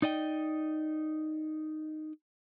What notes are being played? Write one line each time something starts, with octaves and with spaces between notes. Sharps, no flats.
D#4 D5 D#5 G5